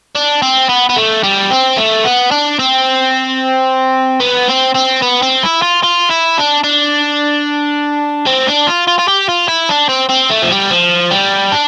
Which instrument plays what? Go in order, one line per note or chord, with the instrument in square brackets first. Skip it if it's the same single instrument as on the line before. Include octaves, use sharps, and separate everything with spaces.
[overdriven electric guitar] D4
C4
B3
B3
A3
G3
C4
A3
B3
D4
C4
B3
C4
C4
B3
C4
E4
F4
F4
E4
D4
D4
C4
D4
F4
F4
F4
G4
F4
E4
D4
C4
C4
A3
F3
G3
F3
G3
D4